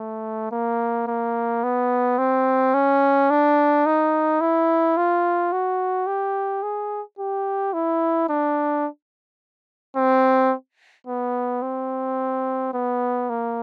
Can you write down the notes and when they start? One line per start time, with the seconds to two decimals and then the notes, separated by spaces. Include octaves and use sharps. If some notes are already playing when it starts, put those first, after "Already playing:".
Already playing: A3
0.51 A#3
1.07 A#3
1.63 B3
2.18 C4
2.74 C#4
3.30 D4
3.86 D#4
4.41 E4
4.97 F4
5.52 F#4
6.07 G4
6.62 G#4
7.19 G4
7.73 E4
8.29 D4
9.96 C4
11.07 B3
11.62 C4
12.74 B3
13.29 A#3